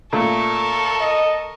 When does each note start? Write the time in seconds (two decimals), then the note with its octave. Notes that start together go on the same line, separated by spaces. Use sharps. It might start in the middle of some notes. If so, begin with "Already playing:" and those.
0.13 A#2 A3 A4 A#4 C#6
1.01 D#5